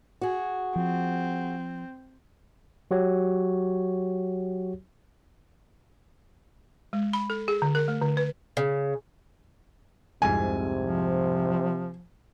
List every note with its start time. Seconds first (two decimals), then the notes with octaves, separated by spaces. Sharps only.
0.21 F#4 G#4
0.76 F3 C4
2.91 F#3 F#4 G4 C#5
6.93 G#3
7.13 B5
7.30 A4
7.48 G#4
7.62 D3
7.75 A#4
7.88 A3
8.02 D3
8.17 B4
8.57 C#3
10.22 C2 F2 G#2 C3 G#5
10.84 F3